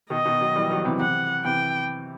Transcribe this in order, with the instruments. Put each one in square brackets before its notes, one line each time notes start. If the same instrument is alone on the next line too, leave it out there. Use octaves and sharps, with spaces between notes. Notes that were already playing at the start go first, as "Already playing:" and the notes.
[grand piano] B2 D#3 [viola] D#5
[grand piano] B2 D#3
D#3 F#3
E3 G3
D#3 F#3
D#3
C3 E3
[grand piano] C3 E3 [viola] F#5
[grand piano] C3 E3 [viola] G5